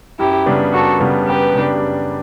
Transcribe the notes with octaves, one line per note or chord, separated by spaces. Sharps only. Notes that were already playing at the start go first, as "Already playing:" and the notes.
F#2 E4 G4
C#3 G3 B3 D4
F#2 F#4 A4
C#3 G3 B3 D4
F#2 G4 B4
C#3 G3 B3 D4
F#2